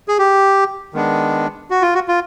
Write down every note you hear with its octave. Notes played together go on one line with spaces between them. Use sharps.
G#4
G4
D#3 G#3 B3 D4
F#4
F4
F#4
F4